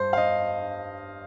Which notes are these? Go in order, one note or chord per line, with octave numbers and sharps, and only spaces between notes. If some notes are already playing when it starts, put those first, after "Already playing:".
Already playing: G2 C5
F5
D#5